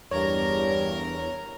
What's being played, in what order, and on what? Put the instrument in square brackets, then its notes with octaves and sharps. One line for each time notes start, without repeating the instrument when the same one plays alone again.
[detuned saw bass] E2 [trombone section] G2 [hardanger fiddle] A#4 A#5 [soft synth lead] C#5